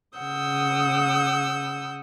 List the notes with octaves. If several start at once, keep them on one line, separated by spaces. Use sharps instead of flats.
C#3 F#5 D#6 E6 G6